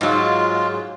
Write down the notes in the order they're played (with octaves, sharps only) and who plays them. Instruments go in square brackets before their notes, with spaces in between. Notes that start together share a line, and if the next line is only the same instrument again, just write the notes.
[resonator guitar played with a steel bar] G#2 F#3 [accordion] G#3 F4